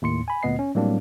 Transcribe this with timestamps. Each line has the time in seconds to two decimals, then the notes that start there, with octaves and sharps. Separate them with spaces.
0.02 D#2 A2 C6 C#7
0.28 G#5 B5
0.43 D2 A#2 B3 D#5 C7
0.59 C#4
0.74 A2 F#3 G3 A#3 C4 D4